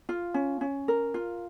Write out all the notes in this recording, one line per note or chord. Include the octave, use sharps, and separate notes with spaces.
F4
C#4
C#4
A#4
F4